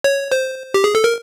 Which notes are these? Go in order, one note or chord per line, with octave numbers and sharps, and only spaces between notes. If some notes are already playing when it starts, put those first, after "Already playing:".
C#5
C5
G4
G#4
A4
A#4